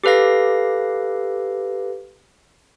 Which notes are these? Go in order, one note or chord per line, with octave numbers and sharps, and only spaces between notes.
G4 A4 B4 F5 A#6